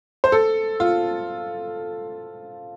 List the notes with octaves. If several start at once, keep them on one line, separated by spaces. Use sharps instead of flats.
C5
A4
F4